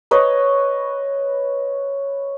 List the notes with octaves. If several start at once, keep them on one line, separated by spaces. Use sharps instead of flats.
B4 C#5 D#5